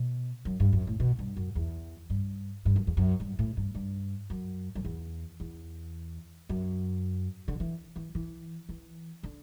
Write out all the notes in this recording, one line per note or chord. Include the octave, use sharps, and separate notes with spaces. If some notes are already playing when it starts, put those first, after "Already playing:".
Already playing: B2
F#2
G2
F#2
A2
B2
G2
F#2
E2
G2
G2
F#2
E2
F#2
G2
A2
G2
G2
F#2
F#2
E2
E2
F#2
D3
E3
E3
E3
E3
D3